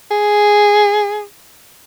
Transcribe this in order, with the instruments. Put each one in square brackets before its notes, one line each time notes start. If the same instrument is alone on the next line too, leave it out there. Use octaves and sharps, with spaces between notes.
[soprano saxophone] G#4